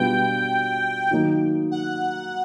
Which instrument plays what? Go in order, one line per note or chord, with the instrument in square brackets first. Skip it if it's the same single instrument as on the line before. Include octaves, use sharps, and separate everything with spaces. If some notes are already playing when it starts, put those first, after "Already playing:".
Already playing: [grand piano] B2 G3 B3 D4 F4 [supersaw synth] G5
[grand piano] D#3 F#3 A#3 D#4
[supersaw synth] F#5